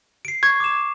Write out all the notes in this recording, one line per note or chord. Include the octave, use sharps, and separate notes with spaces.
C7 D7
C#6 G#6
D6 E7